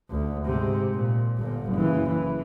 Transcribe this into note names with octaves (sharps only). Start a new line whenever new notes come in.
D2
G#2 C3
A#2
G1 G2
F#1 E3
E3